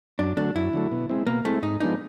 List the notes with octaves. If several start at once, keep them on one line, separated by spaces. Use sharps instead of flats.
F#2 D4
D3 F#3 A3 D4
F#2 E4
D3 F#3 A3
B2
G#3 C4 E4
B2 A#3
G#3 A3 C4 E4
G#2 D#4
F3 G#3 B3 D4 D#4